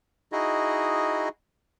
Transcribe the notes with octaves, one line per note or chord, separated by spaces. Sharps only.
D#4 E4 F#4 G#4 D#5